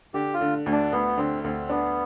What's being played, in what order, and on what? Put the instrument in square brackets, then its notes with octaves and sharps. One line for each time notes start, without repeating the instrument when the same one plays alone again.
[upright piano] D3 [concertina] G4
[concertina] F4
[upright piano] D3
D2
[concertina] D4
[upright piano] D2 [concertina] B3
[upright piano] D3 [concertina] C4
[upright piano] D2 [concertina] C4
[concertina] B3 [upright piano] D4